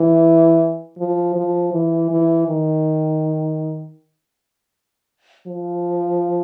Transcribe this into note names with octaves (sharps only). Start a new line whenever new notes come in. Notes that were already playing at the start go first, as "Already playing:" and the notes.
Already playing: E3
F3
F3
E3
E3
D#3
F3